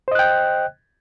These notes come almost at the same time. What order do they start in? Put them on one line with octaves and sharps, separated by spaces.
C5 D#5 F#6 G5